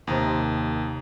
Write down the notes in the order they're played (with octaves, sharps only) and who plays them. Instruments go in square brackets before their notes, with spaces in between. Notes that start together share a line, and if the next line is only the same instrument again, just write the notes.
[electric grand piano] D#2 [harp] C3 D#4 B5